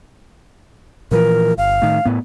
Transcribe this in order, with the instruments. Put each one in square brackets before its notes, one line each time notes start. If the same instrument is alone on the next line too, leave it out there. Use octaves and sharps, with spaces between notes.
[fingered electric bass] A#2 E3 F3 [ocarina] A#4
[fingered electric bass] G1 [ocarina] F5
[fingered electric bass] A2 D#3
A2 B3